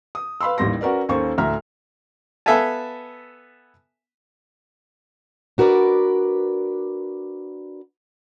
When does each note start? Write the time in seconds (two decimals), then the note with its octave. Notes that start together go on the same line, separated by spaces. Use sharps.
0.15 D#6
0.41 B4 F5 B5 C6 E6
0.58 A1 D#2 G3 C6 A#6
0.81 C#4 F#4 A#4 B4 D5
1.09 D#2 A#3 C#4 A4 C5 C#6
1.38 D2 A2 E5 A#5 F6
2.46 B3 A4 E5 F5 G#5 A5
5.58 D4 F#4 A#4 B4 D5